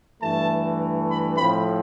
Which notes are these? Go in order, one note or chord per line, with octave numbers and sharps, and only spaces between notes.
G2 E3 A3 A5
B5
A2 F3 C4 B5